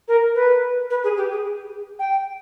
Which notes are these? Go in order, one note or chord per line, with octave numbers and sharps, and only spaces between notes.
A#4
B4
B4
G#4
G4
G#4
G5